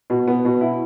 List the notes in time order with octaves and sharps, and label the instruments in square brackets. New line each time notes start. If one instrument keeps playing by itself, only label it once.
[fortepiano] B2
B3
B2
E4